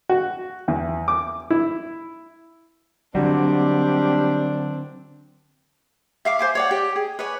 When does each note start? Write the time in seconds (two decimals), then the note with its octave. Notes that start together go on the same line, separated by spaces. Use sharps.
0.09 F#4
0.68 E2
1.08 D6
1.50 E4
3.15 D3 F#3 G3 C4 D4
6.25 E5 F5 D6
6.39 C5 G#5 D6
6.55 C#5 D5 F#5
6.71 G4
6.96 G#4
7.19 B4 C#5 D5 G#5